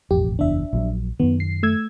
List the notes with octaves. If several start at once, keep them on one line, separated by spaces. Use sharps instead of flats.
E1 A1 F2 G4
F#1 E2 D4 E5
A#1 F3 F#3
F#2 D#3 B3
C7
A3 E6 G#6